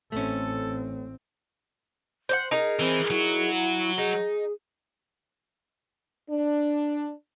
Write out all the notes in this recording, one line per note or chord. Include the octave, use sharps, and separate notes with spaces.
A1 A3 C4 C#4 A4
C5 D5 F#5
D#4 G#4 A#4 D#5
E3 C4
F#3 E4 F#4
D#4 G#4
D4